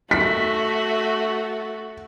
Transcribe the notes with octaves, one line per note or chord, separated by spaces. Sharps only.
A3 F#4 B6